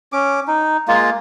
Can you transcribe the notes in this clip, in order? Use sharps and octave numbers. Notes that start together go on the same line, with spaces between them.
C#4 D6
D#4
G#3 A#3 F4